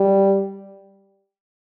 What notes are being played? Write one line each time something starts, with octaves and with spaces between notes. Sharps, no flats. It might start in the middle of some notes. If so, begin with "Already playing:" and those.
Already playing: G3